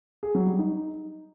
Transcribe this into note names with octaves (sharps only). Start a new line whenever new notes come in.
G#4
F#3
G3
D#4